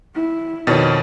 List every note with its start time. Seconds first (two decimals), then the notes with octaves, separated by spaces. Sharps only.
0.15 E4
0.67 F2 B2 D#3 C#5 A6